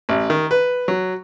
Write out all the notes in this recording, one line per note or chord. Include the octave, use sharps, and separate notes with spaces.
A1
D#3
B4
F#3